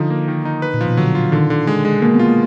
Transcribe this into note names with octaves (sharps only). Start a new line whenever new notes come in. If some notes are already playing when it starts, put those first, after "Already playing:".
Already playing: D3 F3 D#4
A#3
D#3
D#4
B4
A#2
F3
B2
D3 F#3
F4
D3 D#3
D3
G#3
G#3
B2 A#3
B3
F4
A#3